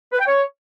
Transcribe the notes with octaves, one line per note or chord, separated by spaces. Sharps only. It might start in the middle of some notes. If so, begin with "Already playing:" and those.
B4
G5
C#5